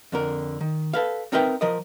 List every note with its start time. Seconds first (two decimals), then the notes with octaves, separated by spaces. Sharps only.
0.12 F2 D3 A#4
0.61 D#3
0.93 A4 B4 F5
1.32 C4 D#4 A#4 B4 E5 G5
1.61 F3 A#4 D#5